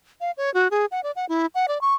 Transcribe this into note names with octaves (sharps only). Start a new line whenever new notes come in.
F5
C#5
F#4
G#4
F#5
D5
F#5
E4
F#5
D5
C#6